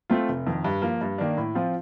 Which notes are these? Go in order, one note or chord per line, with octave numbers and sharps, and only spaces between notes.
A3 C4 F4
F1
F2 D#3
G2
F3 A#3
G2
D#3 A#3 D4
A2
F3 C4 F4